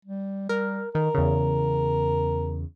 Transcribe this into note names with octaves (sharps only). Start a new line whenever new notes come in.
G3
G3 A#4
D#3 A#4
E2 C#3